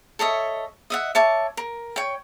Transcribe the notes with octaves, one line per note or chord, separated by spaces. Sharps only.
A4 C#5 D#5 E5
D#5 E5 F#5
C#5 E5 A5 D6
A#4
C#5 G5